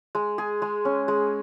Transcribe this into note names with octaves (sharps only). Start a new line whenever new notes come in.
G#3
G#4
G#3
C#4
G#3